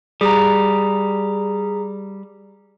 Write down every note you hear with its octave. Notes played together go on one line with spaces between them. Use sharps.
G3 G#4 A#5